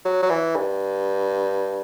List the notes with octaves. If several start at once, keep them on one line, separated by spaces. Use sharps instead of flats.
F#3
F#3
E3
G2